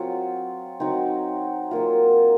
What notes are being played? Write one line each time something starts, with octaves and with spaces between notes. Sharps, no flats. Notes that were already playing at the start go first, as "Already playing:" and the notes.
Already playing: F#3 C4 F4 C5
F#3 C4 D#4
F#3 A#3 F4